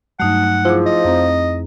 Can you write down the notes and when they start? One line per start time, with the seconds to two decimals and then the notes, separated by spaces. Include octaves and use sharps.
0.20 G2 F#3 A3 D#4 F#5
0.65 F3 E4 G#4 D6
0.86 D#5
1.05 F2 C4 A#5